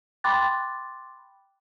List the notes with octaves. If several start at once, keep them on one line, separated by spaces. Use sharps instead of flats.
G5 B5 C6 D6 F#6 A6